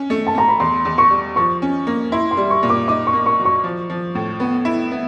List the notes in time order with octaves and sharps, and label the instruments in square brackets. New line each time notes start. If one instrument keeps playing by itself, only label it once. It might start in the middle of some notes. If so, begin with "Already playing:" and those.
Already playing: [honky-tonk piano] C#4
A3
[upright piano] A5
[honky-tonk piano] A3 [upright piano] A#5
[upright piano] B5
[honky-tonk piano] E2 [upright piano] C6
[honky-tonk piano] E2
[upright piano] C#6
[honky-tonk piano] G3
[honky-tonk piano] F3 [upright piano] C#6
[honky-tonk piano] C#4
A#3
[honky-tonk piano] E4 [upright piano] C6
[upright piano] C6
[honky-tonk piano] G3
[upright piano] C#6
[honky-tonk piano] A#2
[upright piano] D6
[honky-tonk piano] D#4 [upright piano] D6
[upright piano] C#6
[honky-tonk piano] A#3
[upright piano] C#6
[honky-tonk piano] F#3
[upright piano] C#6
[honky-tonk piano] F3
F3
A2
B3
E4
B3